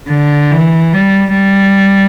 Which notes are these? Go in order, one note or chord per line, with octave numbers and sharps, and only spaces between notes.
D3
E3
G3
G3